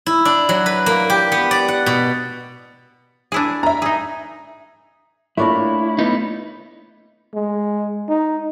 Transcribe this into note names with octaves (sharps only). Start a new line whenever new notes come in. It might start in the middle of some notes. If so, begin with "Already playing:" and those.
E4
D4
F#3
B4
A#3
G4
B3
D5
F#5
B2
D4 E4 G#4
E5 A#5
D#4 G#4
A3 A#3 D4 E4 F4 A#4 C#5
B3 D#4
G#3
D#4